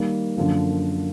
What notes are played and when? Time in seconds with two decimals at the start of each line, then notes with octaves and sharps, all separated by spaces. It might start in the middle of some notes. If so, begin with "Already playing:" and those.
Already playing: D#3 G3 A#3
0.37 F#2 D3 F3 A#3